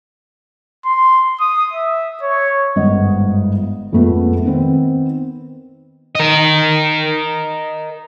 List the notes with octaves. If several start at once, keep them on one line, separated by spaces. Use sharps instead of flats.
C6
D#6
E5
C#5
G1 G#2 B3 D#5 F#5
F2 A#2 G#3 A3 B3
D#3 B3 C4
A#4 D#5